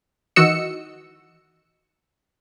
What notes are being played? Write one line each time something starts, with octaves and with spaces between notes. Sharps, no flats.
D#3 E3 F#4 D#5 E6 C#7